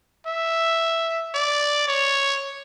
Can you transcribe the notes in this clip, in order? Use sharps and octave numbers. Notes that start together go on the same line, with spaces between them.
E5
D5
C#5